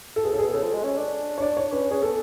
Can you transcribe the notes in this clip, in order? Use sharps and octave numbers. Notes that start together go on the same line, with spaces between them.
A4
B2 G#4
C#3 A4
B2 G#4
C#3 A4
F3
G#3
C#4
D4
C#5
D4 D5
C#5
C#4 B4
C#4 G#4
B3 A4